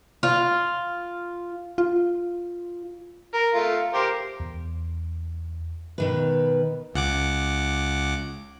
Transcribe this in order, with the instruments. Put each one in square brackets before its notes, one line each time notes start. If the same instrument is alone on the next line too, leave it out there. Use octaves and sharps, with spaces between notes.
[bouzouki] F4
[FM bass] F4
[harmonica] A#4
A3 F4
G4 A#4 C5
[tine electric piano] E2
[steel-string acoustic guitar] B2 D#3 B4
[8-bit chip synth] C#2 F#5 D6